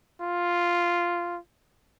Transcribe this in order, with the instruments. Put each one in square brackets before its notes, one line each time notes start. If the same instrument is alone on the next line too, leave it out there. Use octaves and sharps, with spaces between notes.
[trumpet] F4